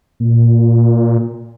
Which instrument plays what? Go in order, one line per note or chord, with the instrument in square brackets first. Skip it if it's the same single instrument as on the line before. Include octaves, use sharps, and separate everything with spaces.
[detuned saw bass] A#2